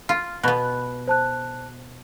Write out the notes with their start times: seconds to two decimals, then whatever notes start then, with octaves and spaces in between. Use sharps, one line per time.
0.09 F4 F6
0.43 B2 B3 B4 B5 F#6
1.08 C5 A5 F#6